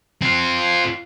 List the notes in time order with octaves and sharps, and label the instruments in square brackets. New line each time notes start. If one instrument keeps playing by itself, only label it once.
[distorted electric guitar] C4 F4